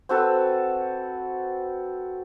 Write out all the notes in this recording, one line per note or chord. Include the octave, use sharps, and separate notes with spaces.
C4 F#4 A4 B4